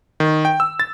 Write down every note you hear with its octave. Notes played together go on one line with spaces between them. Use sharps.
D#3
G5
E6
A6